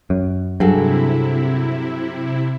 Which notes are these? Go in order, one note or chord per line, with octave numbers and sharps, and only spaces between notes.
F#2
G2 C3 F#3 E4 G#4 A4